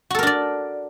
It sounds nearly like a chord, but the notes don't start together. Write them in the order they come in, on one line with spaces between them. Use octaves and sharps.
F#4 A4 A#4 D4 D5